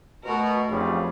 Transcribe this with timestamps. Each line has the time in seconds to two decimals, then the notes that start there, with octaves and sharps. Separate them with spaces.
0.24 B2 A3 F#4 A#4
0.69 B1 F2 C#3 G3